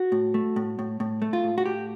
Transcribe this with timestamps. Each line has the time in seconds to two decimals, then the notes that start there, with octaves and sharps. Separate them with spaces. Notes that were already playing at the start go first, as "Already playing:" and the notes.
Already playing: F#4
0.12 A2
0.34 A3
0.56 A2
0.79 A2
1.00 A2
1.22 A3
1.33 F4
1.44 A2
1.58 F#4
1.66 A2 G4